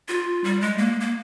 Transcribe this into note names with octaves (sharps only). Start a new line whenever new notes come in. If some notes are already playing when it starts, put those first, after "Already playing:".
F4
G3
G#3
A#3
A#3